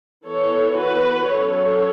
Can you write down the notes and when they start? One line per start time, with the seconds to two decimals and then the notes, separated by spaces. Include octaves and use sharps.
0.27 E3 B3 A4 C#5
0.78 F#4 B4
1.30 F#3 C#4 A4 C#5